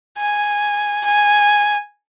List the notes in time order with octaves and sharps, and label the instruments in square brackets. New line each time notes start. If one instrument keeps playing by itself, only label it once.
[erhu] G#5
G#5